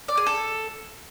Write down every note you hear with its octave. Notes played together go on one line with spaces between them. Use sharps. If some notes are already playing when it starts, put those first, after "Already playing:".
D5
G#4
A4